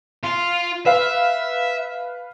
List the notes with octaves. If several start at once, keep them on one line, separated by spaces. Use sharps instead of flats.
F4
B4 E5 F5